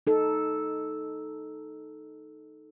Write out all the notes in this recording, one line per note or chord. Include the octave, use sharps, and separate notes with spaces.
D#4 A4